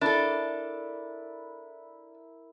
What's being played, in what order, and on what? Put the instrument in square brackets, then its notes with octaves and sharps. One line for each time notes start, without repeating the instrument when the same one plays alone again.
[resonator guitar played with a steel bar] D4 A4 [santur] E4 A#4